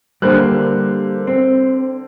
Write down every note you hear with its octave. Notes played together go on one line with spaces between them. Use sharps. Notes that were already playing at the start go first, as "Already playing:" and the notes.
D3 G3 A#3 C5 F#6
C4